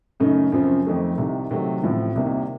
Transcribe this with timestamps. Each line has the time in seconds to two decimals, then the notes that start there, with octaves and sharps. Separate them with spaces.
0.20 F#2 C#3 A3 D#4
0.52 F#2 C#3 F3 C4
0.85 F2 D#3 A3 C4 D#4
1.18 C2 C3 D#3
1.51 C3 D#3 F#3 A3
1.83 A1 A2 F3 C4
2.15 C2 C3 D#3 A#3 D#4